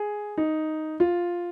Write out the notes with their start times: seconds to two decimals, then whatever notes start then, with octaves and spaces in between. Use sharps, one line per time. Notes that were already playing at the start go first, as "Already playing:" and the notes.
Already playing: G#4
0.38 D#4
1.00 F4